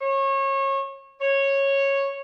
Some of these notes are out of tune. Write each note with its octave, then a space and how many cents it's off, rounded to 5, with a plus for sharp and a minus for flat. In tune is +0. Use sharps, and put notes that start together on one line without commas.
C#5 -30
C#5 -10